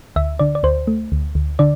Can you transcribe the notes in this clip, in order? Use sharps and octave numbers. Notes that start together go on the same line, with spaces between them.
D2 E5
D3 D5
D5
D2 C5
A3
D2
D2
D3 D5